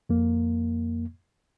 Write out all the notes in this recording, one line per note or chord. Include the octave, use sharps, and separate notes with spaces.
F2 A#3